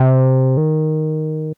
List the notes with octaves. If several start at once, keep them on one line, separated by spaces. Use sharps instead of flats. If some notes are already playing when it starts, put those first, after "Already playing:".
Already playing: C3
D#3